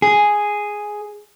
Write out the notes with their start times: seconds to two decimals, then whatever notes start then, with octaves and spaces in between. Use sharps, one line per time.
0.02 G#4